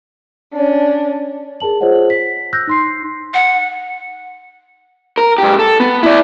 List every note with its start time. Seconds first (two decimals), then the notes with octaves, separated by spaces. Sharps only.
0.52 C#4 D4
1.60 G#4 A#4 A5 F#7
1.81 F4 G#4 C5 C#5 D#5 F#5
2.10 B6
2.53 E6 F#6 G6 A#6
2.67 D#4 C6 C7
3.34 F#5
5.18 A#4
5.38 G#2 G4
5.59 A4
5.80 B3
6.03 E4 D5